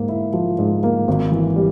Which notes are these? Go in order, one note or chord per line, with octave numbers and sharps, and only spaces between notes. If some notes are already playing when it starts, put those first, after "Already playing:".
Already playing: G#2 A#3
E4
F3
G#2
A#3
G#1
E3
G3